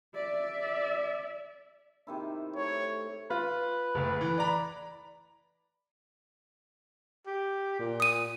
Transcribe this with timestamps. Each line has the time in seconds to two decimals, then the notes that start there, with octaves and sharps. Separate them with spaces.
0.15 D5 E5
2.07 C3 D#3 E4
2.56 A3 C#5
3.30 F4 B4
3.95 F#1 D2
4.21 E3
4.38 D5 A#5 B5
7.26 G4
7.79 A#2
8.00 D#6 D#7